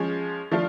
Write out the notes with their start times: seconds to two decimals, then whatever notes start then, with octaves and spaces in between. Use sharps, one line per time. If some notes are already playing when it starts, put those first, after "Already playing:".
Already playing: F3 G#3 C#4
0.51 F3 A3 D4 F4